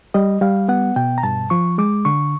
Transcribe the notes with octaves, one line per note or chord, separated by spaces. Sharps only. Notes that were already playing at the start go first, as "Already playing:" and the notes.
G3 D#5
G3 F5
B3 F#5
B2 G5
A#5
G2 A5
F3 C#6
G#3 D6
D3 C#6